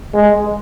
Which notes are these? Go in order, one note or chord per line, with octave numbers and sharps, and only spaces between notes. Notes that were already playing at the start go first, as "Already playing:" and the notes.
G#3